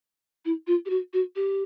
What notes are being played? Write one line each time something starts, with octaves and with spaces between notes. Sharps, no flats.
E4
F4
G4
F#4
F#4
G4